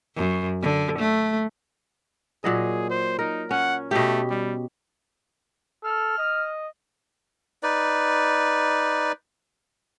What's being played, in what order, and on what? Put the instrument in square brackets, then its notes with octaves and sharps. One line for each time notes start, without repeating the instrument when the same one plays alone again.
[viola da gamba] F#2
D3
A3
[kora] A#2 F#3 D#5 [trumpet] G#4
[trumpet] C5
[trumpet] D#4 [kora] A#4
[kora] C#4 [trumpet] F#5
[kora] B2 G4 [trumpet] A3
[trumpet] G3
[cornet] A4 [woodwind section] F6
[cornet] D#5
[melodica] D#4 B4 D5